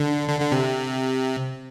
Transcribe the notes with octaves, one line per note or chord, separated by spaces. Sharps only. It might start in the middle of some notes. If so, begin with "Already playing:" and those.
Already playing: D3
D3
D3
C3